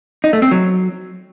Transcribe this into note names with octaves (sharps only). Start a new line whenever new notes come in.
D#4
A3
C4
F#3